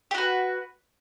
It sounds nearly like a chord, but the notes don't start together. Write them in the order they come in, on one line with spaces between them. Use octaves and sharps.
G4 F#4 B4